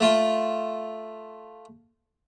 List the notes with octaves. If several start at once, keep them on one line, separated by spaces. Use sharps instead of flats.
A3 F4